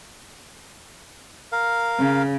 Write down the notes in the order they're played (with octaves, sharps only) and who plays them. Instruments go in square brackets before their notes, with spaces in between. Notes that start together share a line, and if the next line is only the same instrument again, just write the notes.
[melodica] A#4 F5
[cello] C#3